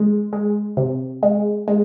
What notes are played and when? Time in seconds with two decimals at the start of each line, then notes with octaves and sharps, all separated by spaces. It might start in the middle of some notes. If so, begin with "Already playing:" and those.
Already playing: G#3
0.33 G#3
0.77 C3
1.23 G#3
1.68 G#3